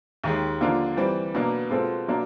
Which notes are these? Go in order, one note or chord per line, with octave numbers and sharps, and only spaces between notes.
D#2 D#3 G#3
D3 F3 A#3 D4 F4
E3 G3 C4
B2 F#3 A#3 D4
B2 G#3 C4 F4 A4
B2 F#3 A#3 D4